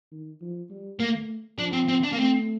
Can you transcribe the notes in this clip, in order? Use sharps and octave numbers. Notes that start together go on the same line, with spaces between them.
D#3
F3
G3
A3 A#3
F3 D4
C4
C4
D4
A#3
A3 C4